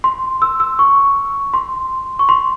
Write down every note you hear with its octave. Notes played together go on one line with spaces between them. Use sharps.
C6
E6
E6
C#6
C6
C#6
C6